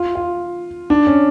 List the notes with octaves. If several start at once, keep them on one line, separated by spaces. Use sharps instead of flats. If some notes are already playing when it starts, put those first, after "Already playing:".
Already playing: F4
F4
D4
C#4